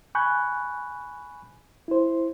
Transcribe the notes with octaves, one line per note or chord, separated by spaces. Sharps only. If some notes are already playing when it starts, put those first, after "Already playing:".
G#5 B5 C#6 F#6 G6
E4 C5